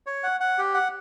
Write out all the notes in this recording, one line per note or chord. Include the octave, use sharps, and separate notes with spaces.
C#5
F#5
F#5
G4
F#5